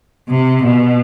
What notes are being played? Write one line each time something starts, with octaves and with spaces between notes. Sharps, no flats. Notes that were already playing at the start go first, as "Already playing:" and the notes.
C3
B2